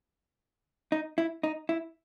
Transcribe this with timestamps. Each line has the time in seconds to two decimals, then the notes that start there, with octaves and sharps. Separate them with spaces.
0.92 D#4
1.18 E4
1.43 D#4
1.69 E4